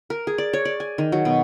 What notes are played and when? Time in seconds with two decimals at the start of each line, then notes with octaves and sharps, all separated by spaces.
0.10 A#4
0.27 G#4
0.38 D5
0.53 C#5
0.65 D5
0.80 G#5
0.98 D#3
1.12 F#3
1.25 B2